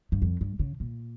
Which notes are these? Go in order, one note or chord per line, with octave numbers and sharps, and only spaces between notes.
G2
F2
G2
C#3
A#2